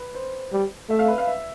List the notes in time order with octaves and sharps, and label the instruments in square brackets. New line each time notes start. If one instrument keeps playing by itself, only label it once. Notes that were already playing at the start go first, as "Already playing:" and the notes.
Already playing: [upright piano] B4
C5
[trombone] G3
[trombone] A3 [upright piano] E5
[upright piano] F5
B4
F5
E5